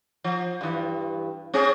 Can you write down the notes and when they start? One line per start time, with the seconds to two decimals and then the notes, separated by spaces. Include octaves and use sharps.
0.24 F3
0.61 G2 E3
1.54 C4 C#4 G#4